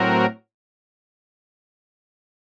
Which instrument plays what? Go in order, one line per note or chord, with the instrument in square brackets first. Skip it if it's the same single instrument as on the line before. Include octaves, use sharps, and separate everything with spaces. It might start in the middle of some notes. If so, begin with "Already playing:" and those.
Already playing: [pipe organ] A2 F#3 C4 F#4 A#4